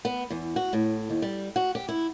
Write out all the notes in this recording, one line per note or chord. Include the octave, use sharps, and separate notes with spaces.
B3
E2
F#4
A2
D#2
G3
F#4
G4
E4